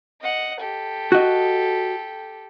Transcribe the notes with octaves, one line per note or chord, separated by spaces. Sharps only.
D#5 F#5
G4 A4
F#4 D#5